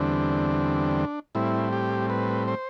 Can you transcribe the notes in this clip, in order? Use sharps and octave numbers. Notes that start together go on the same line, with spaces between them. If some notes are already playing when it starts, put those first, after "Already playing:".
Already playing: E2 D3 G3 C4 D4
A2 G3 C4 E4
G4
B4
C5